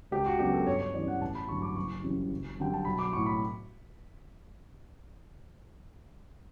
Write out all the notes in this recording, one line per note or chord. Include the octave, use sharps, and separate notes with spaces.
C#2 G4
F#4
C#3 F#3 B3 D4 G4
A4
G2 C#5
C#5
E3 G3 C#4 D5
F#5
A1 A5
B5
G2 D3 F#3 C#6
D6
F#1 C#6
F#2 C#3 E3 G3
F#1
F#2 D3 G3 G5
A5
B1 B5
D6
A2 F#3 C#6
B5